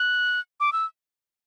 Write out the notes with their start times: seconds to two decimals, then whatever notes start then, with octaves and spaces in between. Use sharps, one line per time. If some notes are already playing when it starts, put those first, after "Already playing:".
Already playing: F#6
0.60 D6
0.73 E6